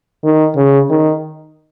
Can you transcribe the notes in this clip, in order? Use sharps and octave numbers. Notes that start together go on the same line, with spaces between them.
D#3
C#3
D#3